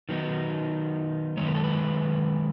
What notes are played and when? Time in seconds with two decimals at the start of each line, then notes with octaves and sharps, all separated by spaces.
0.09 D#3 F#3 B3 D#4
1.37 F#2 D#3 G#3 C#5
1.46 B4
1.55 A4
1.64 B4